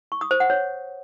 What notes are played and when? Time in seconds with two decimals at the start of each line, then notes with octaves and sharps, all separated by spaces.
0.12 C#6
0.21 D#6
0.31 C5
0.40 F#5
0.50 C#5